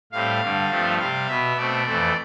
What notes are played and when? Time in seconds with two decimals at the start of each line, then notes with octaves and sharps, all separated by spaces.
0.12 A2 G3 C4 F5
0.42 G2 D3 G3
0.70 G2 F3 A3 C4
0.99 C3 G3 C4 F5
1.28 B2 B3 E5
1.57 B2 A3 C4 D5
1.86 F2 E3 A3 C4